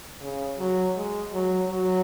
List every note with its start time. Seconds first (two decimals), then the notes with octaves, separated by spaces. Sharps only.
0.22 C#3
0.59 F#3
0.96 G#3
1.33 F#3
1.70 F#3